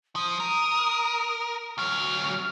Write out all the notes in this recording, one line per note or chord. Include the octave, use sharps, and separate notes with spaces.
F3 D#6
A#4
D2 F#3 F6